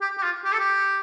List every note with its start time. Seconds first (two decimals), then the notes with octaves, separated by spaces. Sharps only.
0.01 G4
0.18 G4
0.23 F4
0.45 G4
0.53 A4
0.59 G4